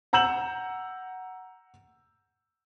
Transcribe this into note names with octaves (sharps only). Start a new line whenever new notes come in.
F#5 A#5 E6 G6 E7 F#7